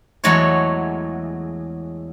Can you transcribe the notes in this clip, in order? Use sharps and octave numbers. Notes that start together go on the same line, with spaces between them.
E2 F#3 G#3 A3 C#5